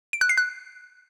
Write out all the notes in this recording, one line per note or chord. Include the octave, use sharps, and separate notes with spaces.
D7
F#6
C7
F#6